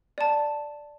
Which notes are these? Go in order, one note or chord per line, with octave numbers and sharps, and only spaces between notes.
D5 A5